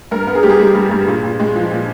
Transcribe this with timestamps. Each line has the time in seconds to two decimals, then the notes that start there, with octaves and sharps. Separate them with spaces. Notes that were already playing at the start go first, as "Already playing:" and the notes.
0.11 G2 A#4
0.27 B3
0.35 G#4
0.43 G3 G4
0.49 G#4
0.60 G3
0.75 G2
0.91 G2
1.07 A#2
1.23 A#2
1.40 G#3
1.56 F3
1.71 A#2